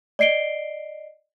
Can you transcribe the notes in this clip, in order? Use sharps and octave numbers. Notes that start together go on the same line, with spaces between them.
D5 D#5 C7 D7 G7